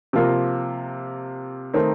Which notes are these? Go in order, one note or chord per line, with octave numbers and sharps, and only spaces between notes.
C3 F3 A#3 F4 A#4
D#3 A3 C4 D#4 A#4